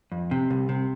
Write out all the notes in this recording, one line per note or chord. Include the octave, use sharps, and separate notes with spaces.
F2
C3
C2
C3